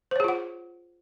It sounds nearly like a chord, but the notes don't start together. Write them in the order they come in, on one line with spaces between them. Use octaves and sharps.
C5 C#5 G#4 F4 F#5